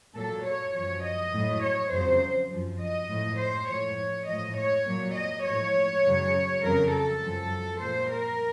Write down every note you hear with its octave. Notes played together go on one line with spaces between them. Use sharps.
A#2 F#3 A4
C#5
F#2 F3 C#5
D#5
A2 F#3
C#5
F2 C#3 F#3 C5
F#2 F3
D#5
A2 F3
C5
A2 F3 C#5
A2 F3 D#5
C#5
A#2 F#3
D#5
A2 F3 C#5
F#2 C#3 F#3
F2 C#3 F#3 A#4
A4
F#2 F3
A#2 F3 C5
A#4